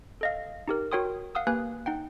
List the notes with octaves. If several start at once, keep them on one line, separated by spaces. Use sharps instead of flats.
A4 D#5 F5
D#4 G4 A#4
F#4 A#4 C#5 G5 C6 D#6
F5 F#5 D#6 E6
A#3 G4 B4 G#5 F#6
D#4 F#5 G5